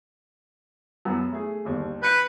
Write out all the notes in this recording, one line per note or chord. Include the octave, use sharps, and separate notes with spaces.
F#2 B3
A3 G#4
G1 D#2
B4 G6 A#6 C#7